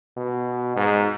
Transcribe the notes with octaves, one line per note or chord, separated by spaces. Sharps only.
B2
G#2